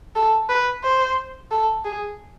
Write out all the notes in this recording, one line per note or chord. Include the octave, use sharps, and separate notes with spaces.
A4
B4
C5
A4
G#4